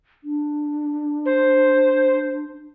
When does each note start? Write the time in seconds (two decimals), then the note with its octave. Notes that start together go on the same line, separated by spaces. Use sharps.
0.24 D4
1.26 C5